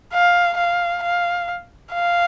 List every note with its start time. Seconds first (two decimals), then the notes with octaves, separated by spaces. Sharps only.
0.14 F5
0.58 F5
1.03 F5
1.93 F5